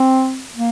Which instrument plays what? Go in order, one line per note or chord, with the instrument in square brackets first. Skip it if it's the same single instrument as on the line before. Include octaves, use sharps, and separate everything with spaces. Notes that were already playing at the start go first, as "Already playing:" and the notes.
Already playing: [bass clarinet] C4
A#3